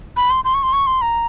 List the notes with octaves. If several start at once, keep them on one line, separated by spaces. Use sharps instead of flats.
B5
C6
C6
C#6
C6
C#6
C6
A#5